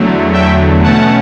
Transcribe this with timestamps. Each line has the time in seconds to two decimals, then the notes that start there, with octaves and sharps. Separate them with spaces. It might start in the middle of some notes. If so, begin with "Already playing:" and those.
Already playing: E2 D3 F#3 A3
0.33 E5 G5
0.83 B2 A3 C#4 F#5 A5